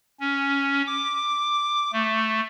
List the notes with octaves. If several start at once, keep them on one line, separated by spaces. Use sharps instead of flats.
C#4
D6
A3